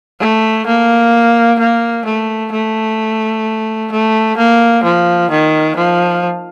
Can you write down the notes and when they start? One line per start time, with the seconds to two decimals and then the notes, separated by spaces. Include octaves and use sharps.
0.20 A3
0.66 A#3
1.59 A#3
2.05 A3
2.52 A3
3.92 A3
4.37 A#3
4.84 F3
5.30 D#3
5.76 F3